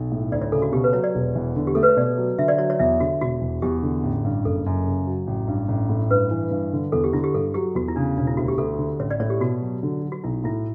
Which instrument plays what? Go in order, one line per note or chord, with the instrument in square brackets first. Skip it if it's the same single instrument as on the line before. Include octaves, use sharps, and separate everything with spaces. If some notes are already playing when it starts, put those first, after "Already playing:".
Already playing: [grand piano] B1
A2
[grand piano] D2 [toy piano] D5
[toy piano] C#5
[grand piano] C#3 [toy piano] A4
[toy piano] F#4
[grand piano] B2 [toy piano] G4
[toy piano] B4
[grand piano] F#3 [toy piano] C#5
[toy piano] D5
[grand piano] E1
E2
D3
[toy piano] G4
[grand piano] A3 [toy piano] A4
[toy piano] B4
C#5
[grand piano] B2 [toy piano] D5
[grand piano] F#3
[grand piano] D3 [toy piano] E5
[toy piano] D5
[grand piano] F#3 [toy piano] C#5
[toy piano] C#5
[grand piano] E2 [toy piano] E5
[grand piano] D3 [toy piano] F#4
[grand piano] E1 [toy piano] F#4
[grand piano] E2
[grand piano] E2 [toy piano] G4
[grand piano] D3
A1
G2
[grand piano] F#1 [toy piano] A4
[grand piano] F#2
C#3
F#3
A1
G2
A1
A2
[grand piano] G2 [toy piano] B4
[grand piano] E3
G2
D3
[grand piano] E2 [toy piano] A4
[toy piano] G4
[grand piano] D3 [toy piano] E4
[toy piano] G4
[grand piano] G2 [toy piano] A4
[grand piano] F#3 [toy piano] G4
[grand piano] E2 [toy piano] F#4
[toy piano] E4
[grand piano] C#3 [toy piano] D4
[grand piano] E1 [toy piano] D4
[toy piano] E4
[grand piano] D2 [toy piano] F#4
[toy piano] G4
[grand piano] D2 [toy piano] A4
[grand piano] D3
[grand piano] A1 [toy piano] C#5
[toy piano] D5
[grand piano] A2 [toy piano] C#5
[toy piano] G4
[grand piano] B2 [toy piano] F#4
[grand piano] F#3
D3
F#3
[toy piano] F#4
[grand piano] B1 [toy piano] E4
[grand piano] A2 [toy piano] E4